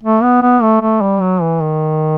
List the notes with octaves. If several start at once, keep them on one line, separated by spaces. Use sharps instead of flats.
A3
B3
B3
A3
A3
G3
F#3
E3
D#3